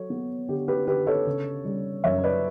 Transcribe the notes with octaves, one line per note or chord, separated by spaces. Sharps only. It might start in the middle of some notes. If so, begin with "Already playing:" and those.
Already playing: F#3 A4 C#5
B3
D3 G4
G4 B4
D3 G4 B4
A4 C#5
C#3
G3
F#2 C#5 E5
B4 D5